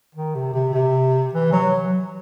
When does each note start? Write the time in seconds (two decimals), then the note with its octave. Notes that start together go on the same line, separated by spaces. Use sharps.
0.15 D#3
0.35 C3
0.54 C3
0.73 C3
1.33 E3
1.53 F#3